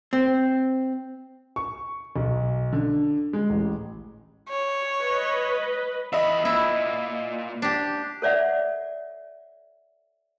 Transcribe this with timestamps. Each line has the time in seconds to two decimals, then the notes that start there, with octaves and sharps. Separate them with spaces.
0.13 C4
1.56 C#6
2.16 B1
2.72 D3
3.33 G#3
3.50 A1
4.49 C#5
5.00 B4 D#5 B5
6.13 E2 D#5 E5 B5
6.45 A#2 E4
7.62 D4 G4
8.22 A4 C#5 D5 E5 F#5